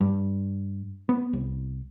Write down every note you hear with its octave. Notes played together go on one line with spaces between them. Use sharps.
G2
B3
C2